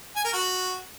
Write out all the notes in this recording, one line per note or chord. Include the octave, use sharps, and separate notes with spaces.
G#5
A#4
F#4